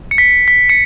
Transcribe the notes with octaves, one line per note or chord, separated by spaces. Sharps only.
C#7
B6
B6
C#7